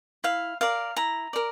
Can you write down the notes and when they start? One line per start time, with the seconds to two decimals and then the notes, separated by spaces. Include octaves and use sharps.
0.24 E4 F5
0.61 A#4 D5 F5
0.96 E4 A#5
1.33 A#4 D5